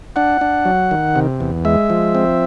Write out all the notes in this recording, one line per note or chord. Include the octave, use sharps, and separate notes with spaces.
D4 F#5
D4
F#3
D#3
C3
E2
G#3 E5
F3
C4